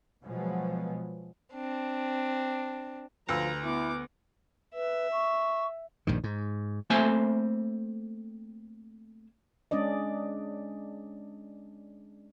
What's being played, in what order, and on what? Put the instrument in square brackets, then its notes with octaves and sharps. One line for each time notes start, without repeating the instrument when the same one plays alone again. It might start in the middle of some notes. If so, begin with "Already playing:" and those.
[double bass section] B2 F3 F#3 G#3 B3
[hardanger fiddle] C4 D4
[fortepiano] D2 B4 E6 [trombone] F3 [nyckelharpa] A#5
[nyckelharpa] B3 D6 [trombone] E4
[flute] B4 [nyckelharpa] E5
[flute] C#6
[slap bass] A#1 G2 D#3
G#2
[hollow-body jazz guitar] A3 A#3 C4 C5 E5 G#5
[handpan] G#3 C#4 D4 D5 D#5